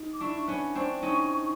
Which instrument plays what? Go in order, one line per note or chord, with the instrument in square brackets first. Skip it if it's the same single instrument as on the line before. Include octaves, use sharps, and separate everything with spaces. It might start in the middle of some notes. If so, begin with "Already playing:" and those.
Already playing: [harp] D#4
[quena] D6
[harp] D4 E4 [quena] C#6
[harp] B3 C#4
[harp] C4 D4 [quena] C#6
[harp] C#4 D#4